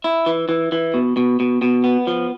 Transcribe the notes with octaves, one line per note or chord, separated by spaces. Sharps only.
E4
E3
E3
E3
B2
B2
B2
B2
B3
F3